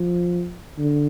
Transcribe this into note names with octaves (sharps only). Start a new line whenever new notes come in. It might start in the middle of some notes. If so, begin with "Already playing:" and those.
Already playing: F3
D3